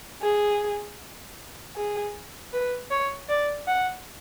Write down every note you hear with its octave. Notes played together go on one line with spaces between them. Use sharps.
G#4
G#4
B4
C#5
D5
F#5